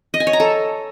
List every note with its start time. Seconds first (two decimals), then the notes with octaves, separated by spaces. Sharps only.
0.14 D#5
0.20 G#5
0.27 C#5
0.33 A#5
0.40 A4